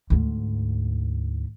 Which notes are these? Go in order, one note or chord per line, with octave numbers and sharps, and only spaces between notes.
D2 G#2